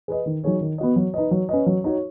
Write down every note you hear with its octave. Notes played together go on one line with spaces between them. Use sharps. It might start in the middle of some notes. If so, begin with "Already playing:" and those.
G#4 B4 D#5
D#3
F#3 D#4 G#4 C#5
D#3
B3 F#4 D#5
F#3
D#4 B4 D#5
F#3
C#4 B4 D#5
F#3
D#4 F#4 C#5